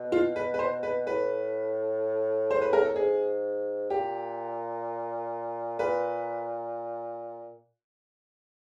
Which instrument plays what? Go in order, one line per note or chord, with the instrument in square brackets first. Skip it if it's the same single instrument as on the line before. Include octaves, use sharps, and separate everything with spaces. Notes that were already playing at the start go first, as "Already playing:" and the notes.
Already playing: [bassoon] B2
[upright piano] F4
B4
B4
C5
B4
[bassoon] A2 [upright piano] B4
[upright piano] C5
B4
A#4
A4
[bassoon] G#2 [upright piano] G#4
[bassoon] A#2 [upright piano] G4
[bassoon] A#2 [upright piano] B4